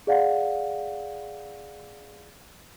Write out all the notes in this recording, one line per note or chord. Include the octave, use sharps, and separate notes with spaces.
G#4 D5 F5 F#5